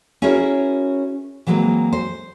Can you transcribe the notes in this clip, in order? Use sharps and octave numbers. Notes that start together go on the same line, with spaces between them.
C#4 E4 F#4 G#4 A#4 C#5
E3 F#3 G#3 A#3 C4
C5